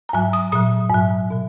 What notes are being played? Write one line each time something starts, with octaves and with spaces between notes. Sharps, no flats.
A#5
G#2 F#3 G#5
D#6
A#2 F#3 D#6
G#2 F#3
B2 F#3